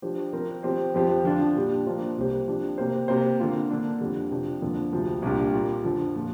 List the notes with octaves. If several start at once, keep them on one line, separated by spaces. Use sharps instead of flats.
F3 D4 G4 C5
F3 C4 A#4
F3 C4 G4 C5
F2 F3 C4 G4 C5
D3 F3 D4 F4
A#2 G3 D4 G4
F3 A#3 D4 F4 C5
C2 C3 A#3 G4 C5
F3 D4 G4
C3 A#3 G4 C5
C3 A#3 G4 C5
D3 A#3 F4
D3 A#3 D4
F2 D3 G3
C3 F3 D4 G4
F2 D3 F3 A#3
D2 C3 F3
C2 A#2 A#3 D4 G4
A#2 G3 A#3
F2 D3 F3
A#2 F3